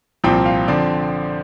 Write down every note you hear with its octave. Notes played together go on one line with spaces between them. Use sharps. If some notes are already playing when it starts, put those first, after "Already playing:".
C2 A#2 F3 C4 G5
F5
D3 F3 C4 D5